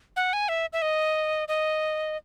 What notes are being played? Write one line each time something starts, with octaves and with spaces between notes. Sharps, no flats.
F#5
G#5
E5
E5
D#5
D#5